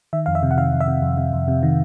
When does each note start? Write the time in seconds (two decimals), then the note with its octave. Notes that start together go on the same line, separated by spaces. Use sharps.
0.13 D#3 E5
0.26 F2 F5
0.35 E5
0.43 C3
0.51 F#5
0.57 D#3 F5
0.73 F2
0.80 E5
0.88 C3
1.02 F2
1.17 C3
1.33 F2
1.48 C3
1.63 D#3